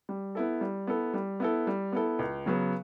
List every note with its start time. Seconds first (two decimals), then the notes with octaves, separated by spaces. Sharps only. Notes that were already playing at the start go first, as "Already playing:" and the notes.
0.09 G3
0.35 B3 E4 A4
0.61 G3
0.87 B3 E4 A4
1.14 G3
1.40 B3 E4 A4
1.67 G3
1.92 B3 E4 A4
2.19 C#2
2.46 C#3 F#3 B3